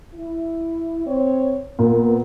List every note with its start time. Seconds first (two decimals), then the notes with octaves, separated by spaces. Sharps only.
0.15 E4
1.07 C4 C#5
1.79 A#2 B3